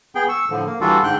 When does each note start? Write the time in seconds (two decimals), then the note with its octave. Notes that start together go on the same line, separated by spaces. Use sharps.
0.15 B3 G#4 G5
0.29 C#6 E6
0.50 A2 D3 F3
0.66 A#3
0.81 E3 G3 D4 F4 F#4 A4
1.04 G#2 D3 G5 F#6